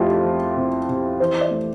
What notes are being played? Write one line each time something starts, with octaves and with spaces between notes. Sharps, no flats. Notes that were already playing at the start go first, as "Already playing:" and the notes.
Already playing: F2 F3 A3 E4 F4 G4
F3
C3
C3
E3 C5
D5
A3